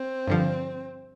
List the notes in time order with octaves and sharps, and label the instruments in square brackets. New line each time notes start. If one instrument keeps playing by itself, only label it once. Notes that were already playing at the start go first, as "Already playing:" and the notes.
Already playing: [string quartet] C4
[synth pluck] G2 D3 F3